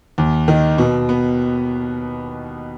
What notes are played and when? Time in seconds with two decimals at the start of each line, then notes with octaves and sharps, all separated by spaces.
0.18 D#2
0.48 D#3
0.78 B2
1.09 B3